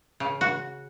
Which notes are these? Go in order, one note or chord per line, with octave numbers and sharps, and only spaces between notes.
C#3
F#4